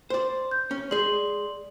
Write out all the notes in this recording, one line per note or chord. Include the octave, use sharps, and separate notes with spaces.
C5 D5 C6
G6
C#4
G#3 G#4 D5 C6 F#7